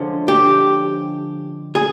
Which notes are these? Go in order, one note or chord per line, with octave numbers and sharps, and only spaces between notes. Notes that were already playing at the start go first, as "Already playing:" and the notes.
Already playing: D3 F3 G#3 C#4
G4
G#4